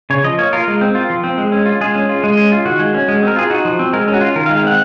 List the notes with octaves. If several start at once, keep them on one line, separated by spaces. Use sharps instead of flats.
C#3 C#5
F3 D#5
A#3 C#5
F4 A#4
G#3
C4
F4
F3
C4
G#3
C#4
F4
G#3 G#4
C#4
F4
G#3
C#4
F4
D#3 F#4
G#3
C#4
G#3
C4 A#4
F4 G#4
D#4 F#4
F3
C4
G#3 A#4
C#4
F#4
F4
D#3 A#4
F5
G#3
F5
C4 F#5